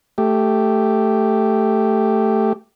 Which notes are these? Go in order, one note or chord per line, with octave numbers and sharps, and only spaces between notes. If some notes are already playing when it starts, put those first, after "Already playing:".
A3 G4